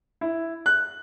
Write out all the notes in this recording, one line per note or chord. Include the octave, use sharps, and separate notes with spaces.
E4
F#6